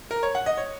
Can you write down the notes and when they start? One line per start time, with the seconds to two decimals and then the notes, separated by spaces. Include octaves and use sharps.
0.11 A#4
0.23 C#5
0.35 F#5
0.46 D#5
0.58 C#5